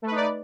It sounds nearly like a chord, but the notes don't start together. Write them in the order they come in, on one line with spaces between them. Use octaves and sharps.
A3 B4 D#4 D5